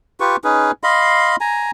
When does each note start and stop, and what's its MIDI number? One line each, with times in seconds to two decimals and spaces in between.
0.20 0.36 65
0.20 0.36 67
0.20 0.36 71
0.20 0.36 85
0.44 0.71 61
0.44 0.71 63
0.44 0.71 68
0.44 0.71 71
0.83 1.36 75
0.83 1.36 77
0.83 1.36 83
0.83 1.36 84
1.41 1.71 80
1.41 1.71 82